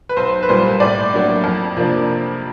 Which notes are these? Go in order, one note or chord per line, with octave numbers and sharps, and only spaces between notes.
B4
B1 C5
B4
A#2 G3 A#3 C5
A2 D5
F#3 A#3 D4
F2
C3 F3 A#3 D4